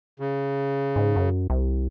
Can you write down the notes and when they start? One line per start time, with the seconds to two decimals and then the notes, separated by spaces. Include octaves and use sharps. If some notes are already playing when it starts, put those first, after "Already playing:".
0.20 C#3
0.96 G#2
1.16 F#2
1.50 C2